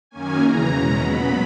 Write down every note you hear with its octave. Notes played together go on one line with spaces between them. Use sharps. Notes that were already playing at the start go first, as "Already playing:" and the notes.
F#2 D#3 A#3 C#4 G#5
E2 C#3 E3 A#5
B2 G#3 C#4
A#2 F#3 B3 B5